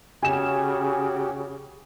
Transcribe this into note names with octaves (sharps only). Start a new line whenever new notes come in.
C#3 F#4 G4 G#5 E7